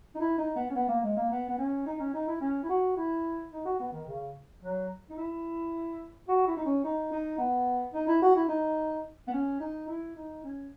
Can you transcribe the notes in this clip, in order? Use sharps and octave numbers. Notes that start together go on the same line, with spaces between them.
D#4
E4
D#4
B3
C#4
B3
A#3
G#3
A#3
B3
B3
C#4
D#4
C#4
D#4
E4
C#4
E4
F#4
E4
D#4
F#4
B3
D#3
C#3
F#3
D#4
E4
F#4
E4
D#4
C#4
D#4
D#4
B3
D#4
E4
F#4
E4
D#4
B3
C#4
D#4
E4
D#4
C#4